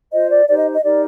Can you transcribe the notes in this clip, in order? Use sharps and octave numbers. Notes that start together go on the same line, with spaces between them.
F4 C5 D#5
D5
D#4 G4 C5 D5
D#5
D#5
D#4 G4 A#4 D5